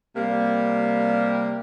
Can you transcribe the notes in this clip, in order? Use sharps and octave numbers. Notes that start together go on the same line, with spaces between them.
C3 G3 A#3